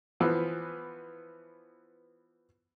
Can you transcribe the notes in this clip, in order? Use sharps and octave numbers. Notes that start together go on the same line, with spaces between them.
E3 F3 B3